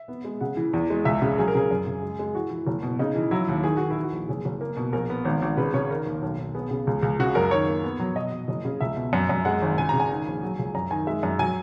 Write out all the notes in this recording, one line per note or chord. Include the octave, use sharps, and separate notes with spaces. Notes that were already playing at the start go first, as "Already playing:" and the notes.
Already playing: E5
B3
G#3
C#3 F#5
E3
E2
G#3
C#2 E5
C#3
F#3 G#4
A#4
C#3 G#4
F#2
C#3
G#3
G#3
E3 F#4
E3
F#1
B2
C#3 D#4
E3
F#3 E4
D#2
D#3 G#4
D#3 F#4
E4
E3
F#4
A#1
F#1 G#4
F#1
A#3
B2
A#1 A#4
B3
G#1
G#1
C#3 B4
C#3 C#5
D#3 A#4
D#2
B1
B1
B3 G#4
C#3
C#2
C#2
C#3 F#4
F#2 A#4
D#3 C#5
A#3
B3
F#3
B2 D#5
F#3
F#1
C#3
C#2 E5
B2
F#2
F#2
G#3 F#5
G#1
C#3 G#5
C#3 A#5
G#5
D#3
A#1
F#3
C#2
F#2 A#5
D#3 G#5
G#3 E5
F#2
F#3 G#5